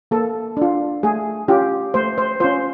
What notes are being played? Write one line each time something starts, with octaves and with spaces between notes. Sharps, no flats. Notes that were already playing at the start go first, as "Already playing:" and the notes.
A#3 A4
D4 F4
A3 G#4
C#4 F4 G4
A3 C5
C5
C#4 F4 C5